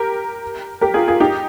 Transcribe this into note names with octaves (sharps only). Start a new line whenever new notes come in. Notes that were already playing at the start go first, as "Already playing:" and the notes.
Already playing: G4 A#4
G4 A#4
F4 G#4
F4 G#4
D#4 G4